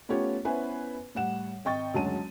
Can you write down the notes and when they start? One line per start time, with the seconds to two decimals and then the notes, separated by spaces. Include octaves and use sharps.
0.09 A3 B3 C#4 F4 G4 C#5
0.45 B3 C#4 E4 B4 C5 G#5
1.15 A2 G3 F#5 E7
1.65 G#1 D#5 G5 C#6 A6
1.94 F#1 D2 F#3 G#3 A5 D#7